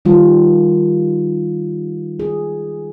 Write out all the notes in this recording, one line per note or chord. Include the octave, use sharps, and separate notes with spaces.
D#3 G3 F4
G#4